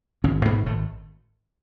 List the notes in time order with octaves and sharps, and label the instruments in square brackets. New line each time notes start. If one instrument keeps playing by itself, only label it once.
[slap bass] G#1 C#3 C#4
G#2 B2 B3
G#1 A2 A3